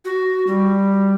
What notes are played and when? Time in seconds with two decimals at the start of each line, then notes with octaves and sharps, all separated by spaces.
0.05 F#4
0.47 G3